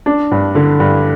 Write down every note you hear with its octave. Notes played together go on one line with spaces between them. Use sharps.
D4
G2
D3
G2